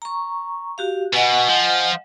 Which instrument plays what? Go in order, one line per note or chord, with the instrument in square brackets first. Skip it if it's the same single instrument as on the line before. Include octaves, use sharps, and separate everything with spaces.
[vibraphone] A#5 C#6
F#4 G4 F5
[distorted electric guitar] B2 [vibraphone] D#5 F#5 G#5
[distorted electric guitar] F3